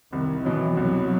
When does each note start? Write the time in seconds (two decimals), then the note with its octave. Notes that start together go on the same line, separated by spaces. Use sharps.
0.12 C2 D#3
0.44 B2 E3 F#3
0.77 C2 F#3